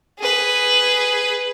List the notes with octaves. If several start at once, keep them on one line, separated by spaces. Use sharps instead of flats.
G#4 B4